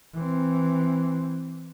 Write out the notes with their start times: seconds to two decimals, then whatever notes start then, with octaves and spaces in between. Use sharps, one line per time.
0.14 E3 C4